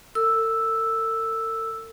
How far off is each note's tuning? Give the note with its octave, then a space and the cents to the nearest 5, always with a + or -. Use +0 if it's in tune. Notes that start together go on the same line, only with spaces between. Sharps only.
A4 +45 E6 +0